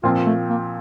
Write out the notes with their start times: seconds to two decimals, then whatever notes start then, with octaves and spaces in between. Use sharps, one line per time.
0.04 A#2 F3 C4 F4
0.26 A3
0.49 A#3